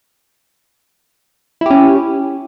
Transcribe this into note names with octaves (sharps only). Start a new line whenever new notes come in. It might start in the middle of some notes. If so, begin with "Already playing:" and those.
C#4 E4 G4